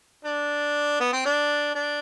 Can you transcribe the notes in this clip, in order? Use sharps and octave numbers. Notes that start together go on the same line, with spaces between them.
D4
B3
C4
D4
D4